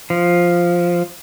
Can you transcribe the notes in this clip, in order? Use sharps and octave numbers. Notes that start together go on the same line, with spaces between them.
F3